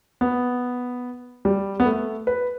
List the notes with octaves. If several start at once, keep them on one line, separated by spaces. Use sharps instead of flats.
B3
G3
B3
A3
B4